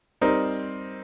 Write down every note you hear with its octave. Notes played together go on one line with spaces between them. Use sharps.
G3 C4 D#4 A#4